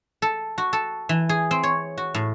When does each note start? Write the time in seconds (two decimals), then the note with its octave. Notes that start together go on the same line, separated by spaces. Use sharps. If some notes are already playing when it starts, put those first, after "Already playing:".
0.22 A4
0.58 F#4
0.73 A4
1.09 E3
1.29 G#4
1.51 C4
1.63 C#5
1.98 F#4
2.15 A2